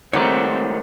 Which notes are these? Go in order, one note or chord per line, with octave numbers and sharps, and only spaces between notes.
C#2 D#3 G3 A3 C4 C#5 F#5 D6